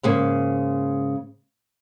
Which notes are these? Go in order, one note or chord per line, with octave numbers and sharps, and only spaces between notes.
G#2 C#3 A#3